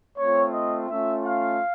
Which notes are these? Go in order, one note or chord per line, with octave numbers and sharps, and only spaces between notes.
A3 C4 F4 C#5
D#5
A3 C#4 F4 E5
F5